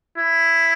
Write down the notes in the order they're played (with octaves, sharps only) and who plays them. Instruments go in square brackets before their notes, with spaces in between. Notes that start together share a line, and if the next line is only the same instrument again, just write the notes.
[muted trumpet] E4